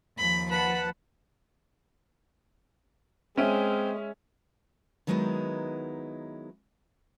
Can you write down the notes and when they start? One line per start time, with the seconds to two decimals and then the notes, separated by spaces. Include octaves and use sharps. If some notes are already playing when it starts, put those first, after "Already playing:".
0.18 D#2 F3 B5
0.51 B4 F#5 A5 B5
3.37 G#3 C4 C#4 E5 D#7
5.07 D#3 F#3 G#3 B3 D#4 E4